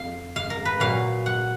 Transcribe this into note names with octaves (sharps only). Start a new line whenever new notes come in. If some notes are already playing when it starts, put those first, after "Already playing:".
Already playing: F2 F5
F5
A#4
B4
A#2 F#3 F5
F#5